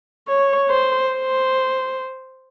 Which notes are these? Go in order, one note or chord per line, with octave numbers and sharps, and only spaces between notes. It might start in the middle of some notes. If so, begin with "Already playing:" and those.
C#5
C5
C5